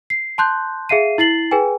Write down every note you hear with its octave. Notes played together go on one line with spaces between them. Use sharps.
C7
A5 C6 F#6 G6
G#4 E5 F5 C7 D#7
E4 A6 C7 F#7
G#4 B4 G5 G#5